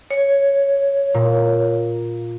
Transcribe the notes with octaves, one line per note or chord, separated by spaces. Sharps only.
C#5
A#2